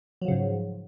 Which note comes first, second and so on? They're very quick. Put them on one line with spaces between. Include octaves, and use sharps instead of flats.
F#3 F3 C#3 G#2